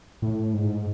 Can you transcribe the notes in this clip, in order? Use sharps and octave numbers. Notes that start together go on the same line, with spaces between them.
A2
G#2